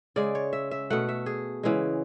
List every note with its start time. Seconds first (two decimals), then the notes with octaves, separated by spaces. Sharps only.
0.16 C#3 G#3 D5
0.35 C#5
0.53 E5
0.71 E5
0.90 B2 A3 F#5
1.09 E5
1.26 G#4
1.63 C#3 E3 G#3